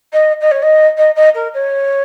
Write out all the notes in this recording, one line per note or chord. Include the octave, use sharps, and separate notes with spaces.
D#5
D#5
C#5
D#5
D#5
D#5
A#4
C#5